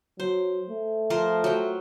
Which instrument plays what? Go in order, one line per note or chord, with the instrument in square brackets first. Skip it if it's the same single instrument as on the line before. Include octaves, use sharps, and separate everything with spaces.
[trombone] F#3 [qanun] C5
[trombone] A3
[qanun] F3 A#4 C5
F#3 G5